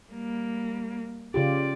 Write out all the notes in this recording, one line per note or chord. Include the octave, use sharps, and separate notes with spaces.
G3 A#3
C#3 F4 G4 D5